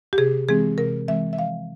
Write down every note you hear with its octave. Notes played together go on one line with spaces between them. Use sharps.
G4
C3 G#4
E3 G#3 C4 G#4
C3 A#4
E3 G#3 C4 E5
E5
F3 F5